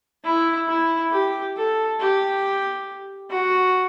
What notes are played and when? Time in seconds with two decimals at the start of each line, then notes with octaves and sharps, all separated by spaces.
0.24 E4
0.68 E4
1.11 G4
1.56 A4
2.00 G4
3.30 F#4